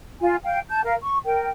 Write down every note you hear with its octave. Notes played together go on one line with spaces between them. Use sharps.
F4 G#5
F5 G5
A5 G6
A#4 F5
C#6
A#4 G5